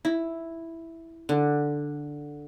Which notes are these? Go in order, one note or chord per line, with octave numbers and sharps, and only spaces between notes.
E4
D3